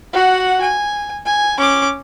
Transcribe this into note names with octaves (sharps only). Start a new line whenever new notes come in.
F#4 F#5
G#5
G#5
C#4 D6